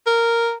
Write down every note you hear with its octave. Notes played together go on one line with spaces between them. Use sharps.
A#4